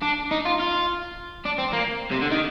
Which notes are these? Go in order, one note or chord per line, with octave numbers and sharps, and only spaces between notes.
D4
D#4
F4
F4
D4
C4
A#3
C3
D3
D#3